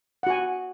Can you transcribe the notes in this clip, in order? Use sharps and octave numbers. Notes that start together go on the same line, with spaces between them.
F#4 F#5 G#5